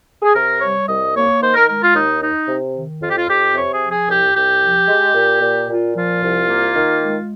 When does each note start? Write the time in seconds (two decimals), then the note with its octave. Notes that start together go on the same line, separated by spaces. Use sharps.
0.22 G#4
0.34 C3 A#4
0.61 G3 C#5
0.87 C2 D#5
1.15 A#3 C#5
1.41 D#3 C5
1.54 A#4
1.67 G#3 A#4
1.82 F4
1.94 D#2 D#4
2.21 D#4
2.48 C3
2.74 D#3
3.01 F2 F4
3.09 G4
3.16 F4
3.28 F2 G4
3.54 C3 C#5
3.72 G#4
3.81 F3
3.90 G#4
4.08 C2 G4
4.35 C2 G4
4.62 F3
4.88 G#3
5.14 A#2
5.41 A#2
5.68 A#2 F4
5.95 F3 F4
6.22 C2
6.48 A#3
6.76 D#3
7.02 G#3